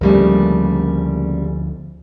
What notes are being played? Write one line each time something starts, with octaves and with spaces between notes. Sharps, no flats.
D2 C#3 F3 G3 A3 A#3